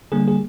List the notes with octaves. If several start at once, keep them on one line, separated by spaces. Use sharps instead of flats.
D3 G3 A#3 G#4
G#4